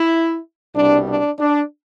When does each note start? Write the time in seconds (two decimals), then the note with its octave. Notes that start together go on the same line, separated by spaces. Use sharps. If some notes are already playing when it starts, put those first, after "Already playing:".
Already playing: E4
0.75 C2 B2 G3 D4
1.08 D4
1.39 D4